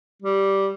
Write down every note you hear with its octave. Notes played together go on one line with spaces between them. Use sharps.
G3